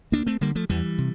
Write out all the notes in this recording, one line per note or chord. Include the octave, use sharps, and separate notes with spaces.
D2 A#3 D4
A3 C4
D3 G3 A#3
F3 A3
E2 E3 G3
C3